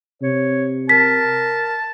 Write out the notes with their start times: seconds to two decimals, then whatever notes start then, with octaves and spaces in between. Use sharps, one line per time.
0.22 C3 C#5
0.89 A#4 A5 B6